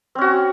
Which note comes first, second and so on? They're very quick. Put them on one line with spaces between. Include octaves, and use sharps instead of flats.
C4 C#4 F#4